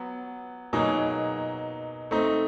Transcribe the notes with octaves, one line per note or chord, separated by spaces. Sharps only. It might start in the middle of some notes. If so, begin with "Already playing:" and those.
Already playing: F#3 B3
B2 F#3 A#3 D#4 G#4
A3 C4 D#4